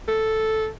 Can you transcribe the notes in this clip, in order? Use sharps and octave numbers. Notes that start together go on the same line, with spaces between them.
A4